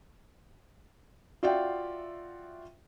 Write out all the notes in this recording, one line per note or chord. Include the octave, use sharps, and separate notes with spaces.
F4 F#4 D5 E5 F5 G5